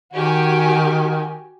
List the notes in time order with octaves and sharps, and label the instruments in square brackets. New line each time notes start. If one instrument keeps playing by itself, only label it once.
[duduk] D#3 [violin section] F#4 G4 G#5